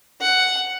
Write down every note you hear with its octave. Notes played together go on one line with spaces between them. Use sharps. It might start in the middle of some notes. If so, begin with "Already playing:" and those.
F#5